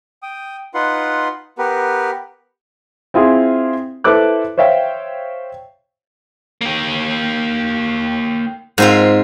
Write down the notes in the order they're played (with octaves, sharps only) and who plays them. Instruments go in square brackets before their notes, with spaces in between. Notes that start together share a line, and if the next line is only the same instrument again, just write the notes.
[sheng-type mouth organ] G5 D#6
D#4 F4 B4 F#5 C6
B3 G4 A#4 B4
[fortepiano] C4 E4 F4 G#4
E4 A4 B4 C5 D6 F#6
C5 C#5 E5 F5 G5
[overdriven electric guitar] A#3 G4
[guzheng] G#2 C4 F4